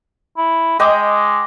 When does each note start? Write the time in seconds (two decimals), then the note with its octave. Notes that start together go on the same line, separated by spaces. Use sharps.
0.37 E4
0.79 G#3 D#5 G5 D6